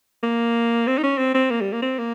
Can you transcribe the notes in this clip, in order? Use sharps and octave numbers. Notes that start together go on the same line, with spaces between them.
A#3
C4
D#4
C#4
C4
C4
A#3
G3
A#3
C4
A#3